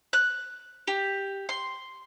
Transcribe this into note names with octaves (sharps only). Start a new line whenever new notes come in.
F#6
G4
C6